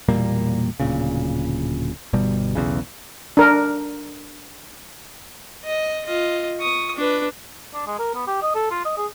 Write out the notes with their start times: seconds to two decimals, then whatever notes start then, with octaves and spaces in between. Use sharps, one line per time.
0.08 E1 A#2 G3 A#3
0.80 D1 A#2 C#3
2.13 G1 B2 G3
2.55 B1 E2 C#3
3.37 D4 A#4
5.65 D#5
6.05 F4 D#5
6.60 C#6 D#6
6.96 D4 B4
7.74 D4
7.87 G#3
7.99 A#4
8.15 B3
8.27 G4
8.42 D#5
8.55 A4
8.71 F4
8.85 D#5
8.97 G#4